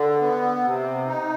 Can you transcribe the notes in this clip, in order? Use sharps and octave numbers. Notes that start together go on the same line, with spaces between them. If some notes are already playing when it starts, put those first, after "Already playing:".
Already playing: D3
B3
C3
D#4